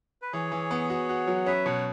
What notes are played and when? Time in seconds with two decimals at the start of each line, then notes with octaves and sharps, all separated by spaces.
0.22 B4
0.33 E3 G#4 C#5
0.52 E3
0.71 B3
0.90 F#4
1.09 F#4
1.27 F#3
1.35 F#5
1.46 C#4 B4 E5
1.66 B2 C#5 F#5